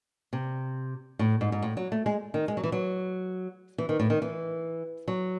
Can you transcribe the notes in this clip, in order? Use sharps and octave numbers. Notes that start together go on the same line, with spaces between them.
C3
A2
G#2
G#2
A2
F#3
A3
G#3
D#3
G#3
F#3
E3
F#3
E3
D#3
A2
D#3
E3
F#3